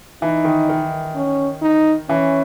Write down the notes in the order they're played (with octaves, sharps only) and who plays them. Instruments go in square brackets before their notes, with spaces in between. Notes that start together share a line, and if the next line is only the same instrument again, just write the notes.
[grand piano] E3 [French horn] D#4
[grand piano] D#3
D#3
[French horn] C#4
D#4
[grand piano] E3 [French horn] C#4